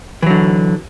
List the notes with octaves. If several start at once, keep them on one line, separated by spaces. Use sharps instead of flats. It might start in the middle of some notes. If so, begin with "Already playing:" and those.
D3 E3 F#3